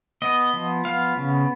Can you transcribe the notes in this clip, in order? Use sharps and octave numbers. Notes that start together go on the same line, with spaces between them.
B3 D#5
F3
B3 F5
C#3